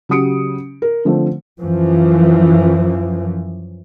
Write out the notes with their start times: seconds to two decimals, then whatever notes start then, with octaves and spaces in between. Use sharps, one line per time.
0.09 C#3 F#3 G4 D#6 C#7 D7
0.82 A#4
1.05 D3 F3 A3 C4
1.61 F#2 E3 F3